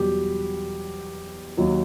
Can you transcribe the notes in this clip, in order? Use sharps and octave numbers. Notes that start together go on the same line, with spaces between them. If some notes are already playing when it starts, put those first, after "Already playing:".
Already playing: E2 B2 F#3 G3 G4
D#2 D#3 F#3